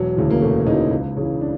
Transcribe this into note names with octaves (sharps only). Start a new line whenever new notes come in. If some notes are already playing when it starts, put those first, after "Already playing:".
Already playing: E1 F#3
D2 C#3 E3
A#3
E1 A3
D2 C#3 E3 D#4
C#2
C#3 E3
D4